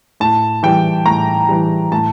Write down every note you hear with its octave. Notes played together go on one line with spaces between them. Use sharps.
A2 A5
E3 G3 G5
A2 A#5
E3 G3
A2 A5